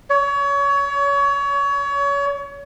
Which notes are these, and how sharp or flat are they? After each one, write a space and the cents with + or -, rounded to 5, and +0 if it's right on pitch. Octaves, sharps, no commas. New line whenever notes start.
C#5 +30